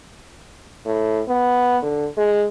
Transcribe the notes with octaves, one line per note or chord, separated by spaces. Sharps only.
A2
B3
D3
G#3